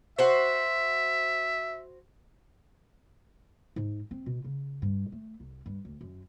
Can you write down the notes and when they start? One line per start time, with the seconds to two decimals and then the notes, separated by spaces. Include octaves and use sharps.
0.18 F#4 C5 E5
3.76 G#2
4.11 C4
4.26 B2
4.44 C#3
4.82 G2
5.12 A3
5.40 C2
5.66 G2
5.85 D2
6.01 F#2